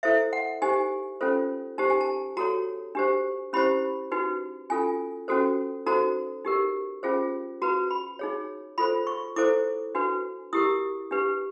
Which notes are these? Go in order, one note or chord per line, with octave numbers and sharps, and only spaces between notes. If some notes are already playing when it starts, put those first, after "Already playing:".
E4 A4 C5 E5
F#5
D#4 G4 C5 G#5
C#4 F4 A4 C5
D#4 G4 C5 A5
G#5
A5
F#4 A4 C#5 A#5
D4 G4 C5
C#4 E4 G4 C5 B5
D#4 F#4 B4
C#4 F4 A4 G#5
C#4 F#4 A4 C5
D#4 F#4 A4 C5 A#5
D#4 G4 A#4
C#4 F4 G#4 C5
F#4 B4 A#5
B5
D#4 G#4 C#5
F4 A4 C5 B5
C#6
E4 A4 C5 D6
D4 F#4 B4
E4 G4 A#4 D#6
D4 G4 B4